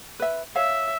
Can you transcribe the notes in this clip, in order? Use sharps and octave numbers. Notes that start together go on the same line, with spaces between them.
B4 E5
C#5 E5 F5